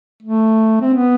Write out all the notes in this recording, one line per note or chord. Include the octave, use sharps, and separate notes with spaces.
A3
C4
B3